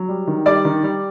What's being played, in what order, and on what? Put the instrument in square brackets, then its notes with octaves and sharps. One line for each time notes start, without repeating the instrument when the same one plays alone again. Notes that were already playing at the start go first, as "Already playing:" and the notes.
Already playing: [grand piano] F#3
G3
D#3
G3 D5 D6
D#3
G3